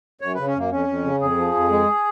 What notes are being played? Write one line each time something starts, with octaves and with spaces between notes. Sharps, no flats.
F#2 C#5
C#3 B4
C#4
F#2 A#3
F2 C#4
F2
C#3
F2 G#4
F3
F2
G#3